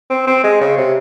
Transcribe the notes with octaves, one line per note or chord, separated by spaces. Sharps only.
C4
C4
G#3
C#3
C3